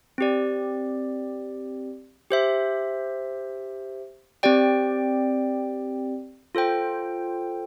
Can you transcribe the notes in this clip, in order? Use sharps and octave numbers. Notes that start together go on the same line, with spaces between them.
C4 G4 D5
G4 C5 E5
C4 G4 D5 G5
F4 A4 C5 G5